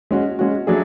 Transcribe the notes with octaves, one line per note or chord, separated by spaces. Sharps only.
G#3 C#4 F#4
G#3 C#4 F#4
F#3 A3 D4 G#4